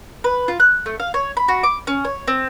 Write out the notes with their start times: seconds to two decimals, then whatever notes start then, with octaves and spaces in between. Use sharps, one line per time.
0.24 B4
0.48 F4
0.60 F#6
0.86 A3
1.00 F5
1.14 C#5
1.37 B5
1.48 F#4
1.63 D6
1.87 C#4
2.05 C#5
2.28 C4